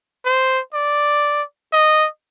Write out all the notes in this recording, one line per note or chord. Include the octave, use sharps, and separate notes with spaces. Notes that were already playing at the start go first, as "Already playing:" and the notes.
C5
D5
D#5